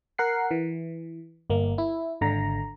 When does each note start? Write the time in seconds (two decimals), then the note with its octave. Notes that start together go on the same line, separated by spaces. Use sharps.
0.18 A#4 F#5 C7
0.51 E3
1.50 G1 A#3
1.78 E4
2.21 G#1 D3 A#5